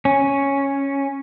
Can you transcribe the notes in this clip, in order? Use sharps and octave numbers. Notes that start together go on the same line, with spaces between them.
C#4